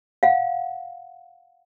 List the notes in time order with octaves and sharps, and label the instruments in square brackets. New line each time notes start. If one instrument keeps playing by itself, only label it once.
[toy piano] F5 F#5